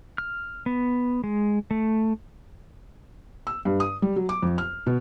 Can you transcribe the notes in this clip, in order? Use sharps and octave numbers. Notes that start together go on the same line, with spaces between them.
F6
B3
G#3
A3
E6
G2
D#6
G3
F#3
D6
F2
F6
B2